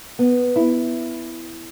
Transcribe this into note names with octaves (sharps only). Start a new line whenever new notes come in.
B3
E4